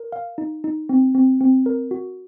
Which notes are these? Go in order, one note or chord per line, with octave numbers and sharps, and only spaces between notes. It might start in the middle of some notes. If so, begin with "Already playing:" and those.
Already playing: A#4
F5
D#4
D#4
C4
C4
C4
A#4
F#4